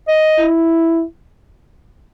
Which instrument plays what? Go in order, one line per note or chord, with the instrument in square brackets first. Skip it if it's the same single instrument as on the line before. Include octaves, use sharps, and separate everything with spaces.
[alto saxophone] D#5
[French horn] E4